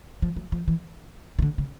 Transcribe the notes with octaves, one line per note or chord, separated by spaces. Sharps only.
F3
F#3
F3
E3
D#3
D3
C#3